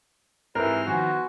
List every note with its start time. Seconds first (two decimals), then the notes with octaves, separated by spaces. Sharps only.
0.55 G#2 C3 E3 C4 A#4 B4 F6
0.87 D#3 F3 B3 F#4 G#5 C6